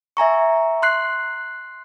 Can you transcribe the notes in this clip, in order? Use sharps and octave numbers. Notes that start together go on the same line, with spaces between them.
E5 G#5 A#5 C#6
C6 F#6 C7